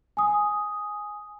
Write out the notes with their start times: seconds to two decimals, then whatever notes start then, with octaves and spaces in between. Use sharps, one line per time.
0.17 G#5 D#6